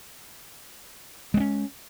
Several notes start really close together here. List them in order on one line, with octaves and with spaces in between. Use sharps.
G#3 C4 C#4